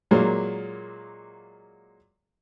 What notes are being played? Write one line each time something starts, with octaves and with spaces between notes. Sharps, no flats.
A#2 F#3 G#3 A#3